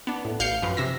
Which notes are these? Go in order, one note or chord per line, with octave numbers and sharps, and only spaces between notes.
B3 D4
A2
A1 F5 G6 C7 C#7
F#2 F3 B4
C3 E5 A#6